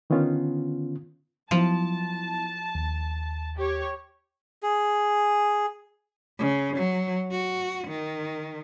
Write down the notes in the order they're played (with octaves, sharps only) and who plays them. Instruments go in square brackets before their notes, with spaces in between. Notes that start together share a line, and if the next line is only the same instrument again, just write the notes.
[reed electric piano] D3 D#3 B3 C#4 F4
[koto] F3 [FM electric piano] F#3 B3 E4 [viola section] A5
[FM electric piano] D#2
[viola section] G4 C#5
[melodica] G#4
[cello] C#3
F#3
F#4
D#3